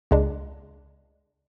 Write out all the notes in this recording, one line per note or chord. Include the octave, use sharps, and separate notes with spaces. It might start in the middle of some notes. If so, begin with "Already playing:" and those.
C#2 G#3 D4